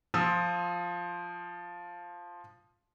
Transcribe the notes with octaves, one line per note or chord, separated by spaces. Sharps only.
F3 F4 D#6 E6